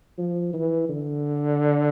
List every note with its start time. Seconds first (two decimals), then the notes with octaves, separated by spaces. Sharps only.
0.18 F3
0.53 E3
0.89 D3